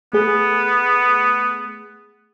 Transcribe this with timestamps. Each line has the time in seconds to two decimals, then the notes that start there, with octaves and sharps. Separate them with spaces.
0.13 A3 B3 G#4